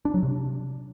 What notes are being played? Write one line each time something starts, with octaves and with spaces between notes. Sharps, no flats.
D4
F#3
C3